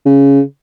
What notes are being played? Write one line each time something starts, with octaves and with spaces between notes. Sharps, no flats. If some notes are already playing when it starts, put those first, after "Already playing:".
C#3